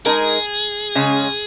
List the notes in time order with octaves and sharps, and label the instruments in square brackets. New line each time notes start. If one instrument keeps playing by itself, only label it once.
[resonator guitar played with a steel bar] G#3 D#4 A#4 [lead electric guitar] G#4
[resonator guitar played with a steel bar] C#3 G#3 C#4